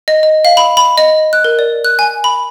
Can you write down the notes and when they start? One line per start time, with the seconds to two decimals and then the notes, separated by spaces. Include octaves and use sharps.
0.08 D#5
0.23 D#5
0.45 F5
0.57 B5
0.77 B5
0.98 D#5
1.33 F#6
1.44 A#4
1.59 D5
1.85 F#6
1.99 G#5
2.24 B5